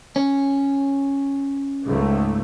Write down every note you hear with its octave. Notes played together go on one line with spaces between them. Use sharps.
C#4
C#2 G#2 A3